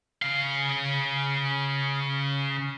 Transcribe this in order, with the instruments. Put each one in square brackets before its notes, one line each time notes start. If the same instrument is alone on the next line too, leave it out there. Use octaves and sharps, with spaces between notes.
[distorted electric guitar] C#3 F5